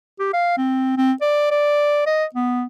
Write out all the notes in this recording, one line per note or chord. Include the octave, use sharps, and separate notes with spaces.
G4
F5
C4
C4
D5
D5
D#5
B3